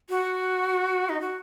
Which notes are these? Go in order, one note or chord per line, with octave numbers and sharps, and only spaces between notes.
F#4
D#4
F#4